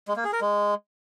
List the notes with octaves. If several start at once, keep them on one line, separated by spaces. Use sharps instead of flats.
G#3
A#3
G#4
A#4
G#3